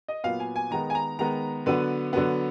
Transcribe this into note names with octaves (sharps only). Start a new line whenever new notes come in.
D#5
A#2 F#3 B3 F5
G#5
G#5
D#3 G#3 B3 A#5
G#5
A#5
D#3 G#3 B3 A#5
D3 F#3 B3 B4
D3 F#3 B3